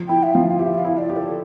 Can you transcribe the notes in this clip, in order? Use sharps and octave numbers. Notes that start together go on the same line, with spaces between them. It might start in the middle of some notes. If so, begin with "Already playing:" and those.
Already playing: F3
E4 G5
E5
F3 F5
F5
G4 E5
F5
E4
D5
G4
A4